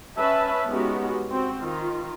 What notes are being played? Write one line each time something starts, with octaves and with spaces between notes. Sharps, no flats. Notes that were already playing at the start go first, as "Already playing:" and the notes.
C#4 B4 E5 A5
G#3 B3 C#4 D#4 F#4 G4
C4 F#4
D#3 F4